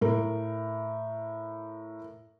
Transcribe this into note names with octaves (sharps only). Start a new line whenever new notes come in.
A2 A#4